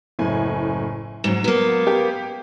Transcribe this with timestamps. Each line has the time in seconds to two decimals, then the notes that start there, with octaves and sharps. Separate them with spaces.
0.19 F#1 A2 G#5
1.24 G#2 F#3 E7
1.44 A#3 B3
1.87 G4